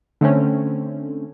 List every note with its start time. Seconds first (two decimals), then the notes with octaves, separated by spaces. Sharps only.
0.21 D3 A3 C4 C#4